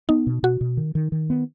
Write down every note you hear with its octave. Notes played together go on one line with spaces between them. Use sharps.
B3 D#4
B2
B2 F#4
B2
D#3
D#3
D#3
B3